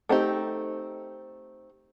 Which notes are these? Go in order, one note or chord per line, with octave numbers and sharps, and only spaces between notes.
A3 C4 D#4 G4